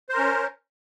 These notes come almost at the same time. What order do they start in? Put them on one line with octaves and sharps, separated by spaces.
C5 A#4 C#4